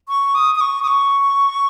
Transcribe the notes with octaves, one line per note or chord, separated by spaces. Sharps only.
C#6
D#6
D#6
C#6
D#6
C#6